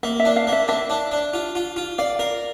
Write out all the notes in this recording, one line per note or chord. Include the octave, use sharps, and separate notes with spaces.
A#3 E5
E5
D4
F5
A#3
E5
D4 E5
D4
D4
F4
F4
F4
D5 F5
A#4 F5